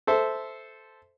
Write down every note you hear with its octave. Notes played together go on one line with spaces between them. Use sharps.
A4 C5 E5